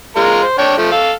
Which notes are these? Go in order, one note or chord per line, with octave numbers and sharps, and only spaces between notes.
G#3 F4 A#4
C5
D4 C#5 G5
F3 A3
A4 F5